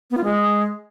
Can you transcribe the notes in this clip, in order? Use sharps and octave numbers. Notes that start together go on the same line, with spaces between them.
B3
F4
G#3